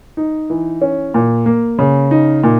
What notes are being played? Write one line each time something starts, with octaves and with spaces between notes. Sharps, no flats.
D#4
E3
C#4
A#2
A#3
C#3
D#4
A#2